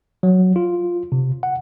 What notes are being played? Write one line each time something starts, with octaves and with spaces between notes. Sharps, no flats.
F#3
F4
C3
F#5